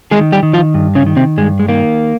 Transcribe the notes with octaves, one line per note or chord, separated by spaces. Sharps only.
D#3 G#3 G#4
G3 G4
D#3
F3 F4
G2
C#3 C#4
D#3
C3 C4
G2 G#3
G#3
D#3 A#3